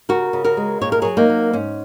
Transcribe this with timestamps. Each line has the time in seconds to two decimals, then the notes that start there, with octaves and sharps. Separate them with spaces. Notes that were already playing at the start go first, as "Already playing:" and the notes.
0.09 C#3 F#4 A#4
0.33 C#3
0.44 F#4 A#4
0.57 G#3
0.81 A#2 C#5
0.92 A#4
1.02 F#3 G#4 C#5
1.17 A#3 D#4
1.29 F#3
1.53 G#2 C#4